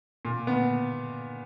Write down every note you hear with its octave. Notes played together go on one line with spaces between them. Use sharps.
A#2
B3